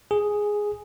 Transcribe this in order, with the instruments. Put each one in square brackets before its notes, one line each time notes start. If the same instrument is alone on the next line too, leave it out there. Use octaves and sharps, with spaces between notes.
[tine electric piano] G#4